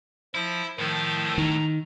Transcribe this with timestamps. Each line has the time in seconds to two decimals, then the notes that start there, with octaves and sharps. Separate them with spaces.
0.35 F3 E4
0.79 A2 D#3 F3 A4
1.38 D#3 A#5